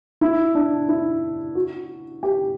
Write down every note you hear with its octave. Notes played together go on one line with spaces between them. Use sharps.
E4
D4
E4
F#4
G4